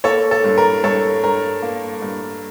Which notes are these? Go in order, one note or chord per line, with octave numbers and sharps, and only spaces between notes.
A#3 A4 C#5
A4
G2
A#4
G2 A4 C#5
G2 A#4
A#3
G2